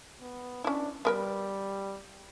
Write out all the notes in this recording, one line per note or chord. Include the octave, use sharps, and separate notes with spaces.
B3
C#4 D4 E4
G3 B3 A#4 B4